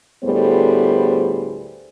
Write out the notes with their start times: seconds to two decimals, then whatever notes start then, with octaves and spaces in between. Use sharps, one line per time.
0.24 D2 A2 G3 B3 G#4 C5